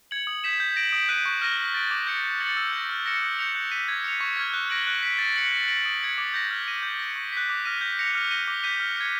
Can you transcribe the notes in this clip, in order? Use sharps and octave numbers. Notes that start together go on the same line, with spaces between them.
G#6 C#7 F#7
D#6
G6 B6 E7
G6
A#6 D7 F#7
D#6
F#6 B6 D#7
C#6
F6 A#6 D#7
F6
A6 D7
D6
G6 A#6 C#7
F#6
A6 C#7 F#7
E6
G6 A#6
F6
A#6 C#7 E7
D#6
G6 A#6 C#7 F7
F#6
B6 D#7
G#6
C#7 F7
C#6
F6 G#6
F#6
A#6 D7 F#7
F#6
B6 D7 F#7
A6
C#7 F#7
F#6
A#6 D7 F#7
D#6
G#6 C#7 F#7
D6
G6 A#6
F6
A#6 D#7
G6
A#6 C#7
C#6
F#6 B6
D6
F6 A#6 D#7
G6
A#6 C#7 F7
F6
A#6 D#7 G7
D6
G6 B6 D#7 G7
F6
G#6 C#7